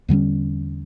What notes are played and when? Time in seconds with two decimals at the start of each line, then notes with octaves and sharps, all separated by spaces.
0.08 E2 D3 G3 C#4